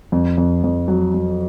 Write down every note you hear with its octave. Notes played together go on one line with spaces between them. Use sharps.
F2
F2
F2
F#3
F#3